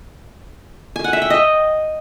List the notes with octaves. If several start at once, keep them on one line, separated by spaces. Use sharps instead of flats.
G#5
F#5
E5
G5
D#5